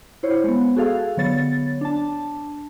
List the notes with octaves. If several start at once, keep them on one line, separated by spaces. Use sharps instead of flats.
E4 C5 C#5
G#3 B3
F#4 G#4 A4 F5
D3 F#3 B3 C#5 A6
D4 A5